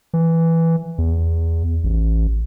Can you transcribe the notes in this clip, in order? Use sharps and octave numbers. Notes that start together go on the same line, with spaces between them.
E3
E2
A1